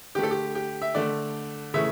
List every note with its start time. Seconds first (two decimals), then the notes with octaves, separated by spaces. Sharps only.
0.15 D3 G4
0.18 A3 A4
0.31 G4
0.55 G4
0.82 E5
0.95 D3 A3 D5
1.74 C#3 E3 A3 E5